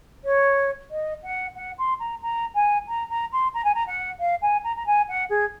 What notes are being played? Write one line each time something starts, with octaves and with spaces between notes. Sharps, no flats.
C#5
D#5
F#5
F#5
C6
A#5
A#5
G#5
A#5
A#5
C6
A#5
G#5
A#5
F#5
F5
G#5
A#5
A#5
G#5
F#5
G#4